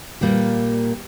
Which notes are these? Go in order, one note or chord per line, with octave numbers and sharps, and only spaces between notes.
A#2 G3 A#3 G4